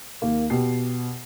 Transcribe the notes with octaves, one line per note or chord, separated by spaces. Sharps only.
D#2 A#3
B2 G4 C7